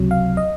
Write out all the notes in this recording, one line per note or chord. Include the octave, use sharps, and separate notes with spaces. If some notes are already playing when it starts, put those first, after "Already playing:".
Already playing: C#2 C3 F#3
F5
D#5